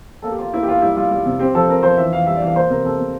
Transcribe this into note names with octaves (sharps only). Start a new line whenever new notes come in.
A#3 A4
G4
A#3 F4
A#3 E4
G4
A#3 F4
G3 E4
G3 F4
G3
C3
C4 G4
F3 A4
C4 A#4
F3 C5
E3 E5
E3 F5
G3 E5
D5
E3 F5
A#3 C5
C3 A#4
C3 A4
C3